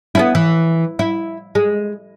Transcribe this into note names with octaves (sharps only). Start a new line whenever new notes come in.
B3 C#4 E4
E3
E4
G#3